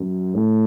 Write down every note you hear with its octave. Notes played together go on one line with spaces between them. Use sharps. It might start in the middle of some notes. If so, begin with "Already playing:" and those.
Already playing: F#2
A2